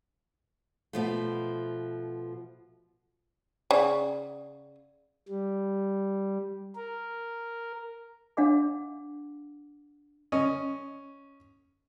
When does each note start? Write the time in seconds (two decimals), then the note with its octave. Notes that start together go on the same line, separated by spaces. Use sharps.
0.93 B2 F3 A3
3.71 C#3 D5 F#5 G5
5.28 G3
6.75 A#4
8.37 D4 F5 F#5 D6
10.32 C#4 D#5